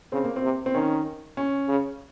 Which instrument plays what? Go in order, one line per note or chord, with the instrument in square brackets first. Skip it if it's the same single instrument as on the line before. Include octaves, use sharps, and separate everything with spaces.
[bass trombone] C#3 [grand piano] C4
[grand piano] A#3
C4
[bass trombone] C3
[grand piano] C4
[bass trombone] D#3 [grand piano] C#4
[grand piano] C#4
[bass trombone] C#3